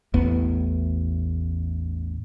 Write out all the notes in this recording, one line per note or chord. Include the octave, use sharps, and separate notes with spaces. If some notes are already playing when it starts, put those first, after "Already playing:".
A1 E2 A2 B3